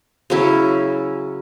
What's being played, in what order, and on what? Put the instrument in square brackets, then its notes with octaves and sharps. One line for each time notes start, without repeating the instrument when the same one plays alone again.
[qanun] C#3 F#3 C#4 E4